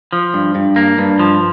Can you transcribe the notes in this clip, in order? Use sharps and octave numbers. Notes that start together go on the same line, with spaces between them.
F3
G2
G2
A#3
G2
F3